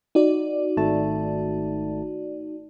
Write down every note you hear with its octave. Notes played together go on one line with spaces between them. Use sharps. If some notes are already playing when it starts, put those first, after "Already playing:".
D#4 F#4 D5
G#1 A3 A5